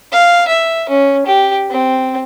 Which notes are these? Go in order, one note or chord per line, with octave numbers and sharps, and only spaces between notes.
F5
E5
C#4
G4
C4